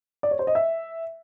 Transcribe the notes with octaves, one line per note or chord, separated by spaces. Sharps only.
D5
C#5
C5
D#5
E5